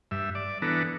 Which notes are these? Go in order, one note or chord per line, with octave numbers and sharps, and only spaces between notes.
G2 E5
D5
E3 B3 D4 A4 A#5